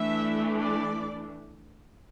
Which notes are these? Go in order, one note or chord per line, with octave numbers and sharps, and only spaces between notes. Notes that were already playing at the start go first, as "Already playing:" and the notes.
Already playing: E3 A3 D4 E5
D5